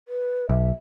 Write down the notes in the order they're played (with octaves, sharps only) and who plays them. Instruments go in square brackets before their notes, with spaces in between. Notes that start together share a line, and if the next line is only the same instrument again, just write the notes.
[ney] B4
[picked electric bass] B1 [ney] E5